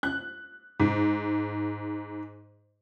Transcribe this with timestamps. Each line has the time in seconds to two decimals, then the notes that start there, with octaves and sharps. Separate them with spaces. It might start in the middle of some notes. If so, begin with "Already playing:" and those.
0.03 F#6
0.80 G#2